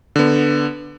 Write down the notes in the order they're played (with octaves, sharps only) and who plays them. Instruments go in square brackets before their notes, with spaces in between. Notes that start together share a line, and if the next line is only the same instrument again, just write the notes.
[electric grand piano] D3 B3